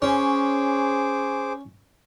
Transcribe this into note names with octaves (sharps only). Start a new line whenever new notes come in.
C#4 G#4 C5 D6